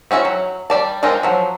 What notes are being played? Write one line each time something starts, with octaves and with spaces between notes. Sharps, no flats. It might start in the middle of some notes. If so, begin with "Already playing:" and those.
C4 C#4 E4 F#4
F#3
G3 D5 A5
D#3 G#3 C4 D#4 F4
F3 F#3